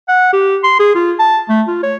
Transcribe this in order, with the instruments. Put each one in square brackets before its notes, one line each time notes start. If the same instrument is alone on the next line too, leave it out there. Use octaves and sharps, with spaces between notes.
[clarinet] F#5
G4
C6
G#4
F4
A5
A3
F4
C#5